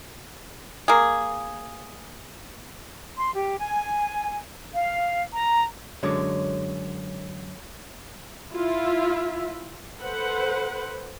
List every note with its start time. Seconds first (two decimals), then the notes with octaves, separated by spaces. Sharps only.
0.88 A#3 G#4
3.17 C6
3.33 G4
3.58 G#5
4.74 F5
5.32 A#5
6.03 F#2 D3 G#3 C#5 D6
8.54 E4 F4 E5
10.00 A4 B4 C5 F#5